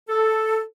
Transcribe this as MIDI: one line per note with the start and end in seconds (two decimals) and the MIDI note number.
0.08 0.62 69